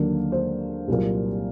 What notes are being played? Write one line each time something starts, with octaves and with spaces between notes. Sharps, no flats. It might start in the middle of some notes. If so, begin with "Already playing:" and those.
Already playing: D#2 D3 F#3 A#3
C5
C2 A#2 F#3 A#3